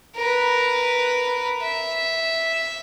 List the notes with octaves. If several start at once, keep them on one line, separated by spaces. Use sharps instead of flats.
A#4 B4
E5